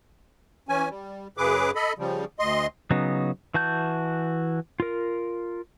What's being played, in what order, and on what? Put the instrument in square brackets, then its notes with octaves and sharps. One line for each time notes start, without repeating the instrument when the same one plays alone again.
[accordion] E3 C#4 G#5
G3
F#2 C#3 G#4 B4 D6
A4 D#5 B5
C#3 F3 G3
D2 D#5 C6
[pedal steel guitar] C#3 F#3 B3 D#4
E3 F#4 A5 G6
F4 A#4